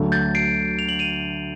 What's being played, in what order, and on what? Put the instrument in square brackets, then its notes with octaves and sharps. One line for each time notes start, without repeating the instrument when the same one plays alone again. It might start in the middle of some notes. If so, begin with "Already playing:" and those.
Already playing: [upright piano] D2 D3 F#3 A3
[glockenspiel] G6 A6
C7 D7
F7
F#7
D#7 F7